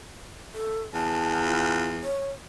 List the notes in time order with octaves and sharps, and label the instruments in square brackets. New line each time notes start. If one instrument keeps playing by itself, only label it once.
[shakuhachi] A4
[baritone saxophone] E2 [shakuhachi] A5
[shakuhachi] F4
C#5